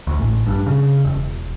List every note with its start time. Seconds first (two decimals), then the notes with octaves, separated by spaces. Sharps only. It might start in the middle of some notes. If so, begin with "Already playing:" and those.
0.07 D2
0.19 A1
0.47 G2
0.67 C#3
1.04 E1